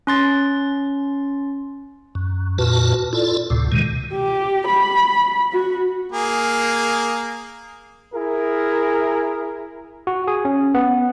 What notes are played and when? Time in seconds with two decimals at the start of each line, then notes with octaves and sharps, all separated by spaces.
0.07 C#4 C6 A6
2.15 F#2
2.58 F2 A#2 F#4 B4 A5
3.13 E4 F4 A4 D5
3.50 D2 A2 C3
3.72 B2 D#3 G#3
4.13 G4
4.68 B5
5.52 F#4
6.12 A#3 G#4
8.14 E4 G#4 A#4
10.07 F#4
10.28 G#4
10.45 C#4
10.74 B3